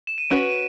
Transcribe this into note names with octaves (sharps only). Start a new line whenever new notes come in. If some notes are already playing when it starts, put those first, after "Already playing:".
E7
D#7
C#4 F#4 B4 D7
D#7